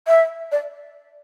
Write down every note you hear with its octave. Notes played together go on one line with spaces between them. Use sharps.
E5
D5